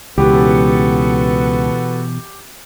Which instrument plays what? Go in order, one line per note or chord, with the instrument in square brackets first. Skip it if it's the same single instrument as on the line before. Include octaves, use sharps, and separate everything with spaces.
[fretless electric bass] C#2 [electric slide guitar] B2 E3 [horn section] B3 F#4 A4 [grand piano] G4